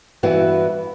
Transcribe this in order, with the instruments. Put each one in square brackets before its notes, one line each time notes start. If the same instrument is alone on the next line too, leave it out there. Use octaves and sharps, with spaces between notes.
[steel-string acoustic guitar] G2 E3 B3 E4 F#4 B4